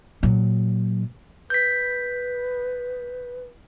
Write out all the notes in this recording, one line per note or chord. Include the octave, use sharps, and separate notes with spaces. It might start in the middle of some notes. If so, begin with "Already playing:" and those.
A#2 F#3
B4 G6 B6